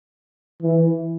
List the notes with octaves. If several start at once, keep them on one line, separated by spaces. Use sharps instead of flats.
E3